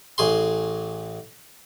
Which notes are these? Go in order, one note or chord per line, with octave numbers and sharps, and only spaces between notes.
A1 G#4 C6